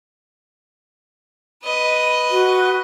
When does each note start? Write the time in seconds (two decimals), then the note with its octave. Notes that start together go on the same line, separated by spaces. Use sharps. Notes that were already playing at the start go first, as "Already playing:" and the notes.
1.63 B4 D#5
2.31 F#4